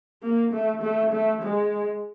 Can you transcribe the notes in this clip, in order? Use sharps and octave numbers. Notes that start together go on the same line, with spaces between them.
A#3
A3
A3
A3
G#3